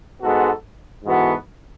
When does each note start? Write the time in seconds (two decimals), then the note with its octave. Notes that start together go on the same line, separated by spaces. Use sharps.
0.21 G#2 G#3 B3 F#4 A4
1.05 G#2 E3 B3 F#4 A4